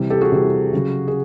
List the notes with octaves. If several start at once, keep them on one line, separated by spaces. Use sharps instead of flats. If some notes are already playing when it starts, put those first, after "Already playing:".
Already playing: C3 E3 G3
G4 A4
F#4 G#4
C3 E3 G3
C#3 F#3
G#4